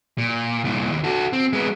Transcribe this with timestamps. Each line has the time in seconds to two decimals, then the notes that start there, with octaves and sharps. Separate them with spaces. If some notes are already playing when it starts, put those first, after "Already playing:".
0.18 A#2
0.64 C2 A#2
0.92 D#2
1.04 F#4 A4
1.33 C4
1.53 G#3 B3